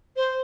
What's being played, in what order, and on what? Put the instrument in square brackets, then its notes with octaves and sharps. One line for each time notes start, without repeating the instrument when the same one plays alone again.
[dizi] C5